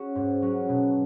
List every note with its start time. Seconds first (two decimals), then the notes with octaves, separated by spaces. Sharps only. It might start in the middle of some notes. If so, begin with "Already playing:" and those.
Already playing: C#4 D#4 F#4 G#4
0.15 G#2
0.42 F#3 C#4 F#4
0.69 B2